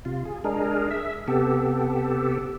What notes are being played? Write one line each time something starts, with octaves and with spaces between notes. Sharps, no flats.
C3 F4
G#4
G#3 D4 G#4 A#4
E5
C3 B3 G4 A4